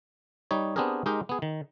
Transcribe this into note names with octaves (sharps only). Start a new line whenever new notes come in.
G3 D#4 C#5
B3 C4 D4 G4 G#4 A#4
G#3 D#4 G4 A#4 G5
B3 G#4
D#3